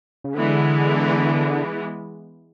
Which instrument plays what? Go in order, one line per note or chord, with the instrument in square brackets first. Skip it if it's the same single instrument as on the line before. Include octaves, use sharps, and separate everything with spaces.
[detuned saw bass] C#3
[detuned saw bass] D3 [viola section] E3 G#3 B3